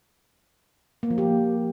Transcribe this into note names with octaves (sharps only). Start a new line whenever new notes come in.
A#3
F3
G4